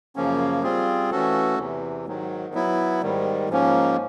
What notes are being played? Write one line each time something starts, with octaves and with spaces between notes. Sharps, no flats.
F#2 C#3 F3 A#3 C#4
G3 C4 F4 G#4
E3 A3 C#4 F#4 A4
E2 C3 E3
G#2 D#3 F#3
F#3 B3 E4
G#2 D#3 G3
G#2 F3 A#3 C#4